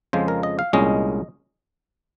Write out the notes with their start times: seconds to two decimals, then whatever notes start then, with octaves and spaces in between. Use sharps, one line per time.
0.13 F2 C#3 F3 G#3 C5
0.28 A#4
0.43 D#5
0.59 F5
0.73 C2 A#2 G#3 C#4 D#5